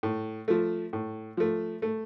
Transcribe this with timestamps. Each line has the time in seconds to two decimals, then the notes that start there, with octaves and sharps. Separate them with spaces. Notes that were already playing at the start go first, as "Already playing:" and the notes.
0.03 A2
0.48 F3 A3
0.93 A2
1.37 F3 A3
1.82 A3